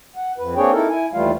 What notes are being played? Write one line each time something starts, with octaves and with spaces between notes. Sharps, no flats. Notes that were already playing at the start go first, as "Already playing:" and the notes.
F#5
F2 B4
A#3 C4 D4 G#4 C#5 G5
D#4 E4 A4 A#4
E4 G#5
D#2 E3 G3 A3 F4 F5